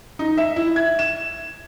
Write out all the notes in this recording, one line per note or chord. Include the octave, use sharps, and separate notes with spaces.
D#4
E5
E4
G#6
E7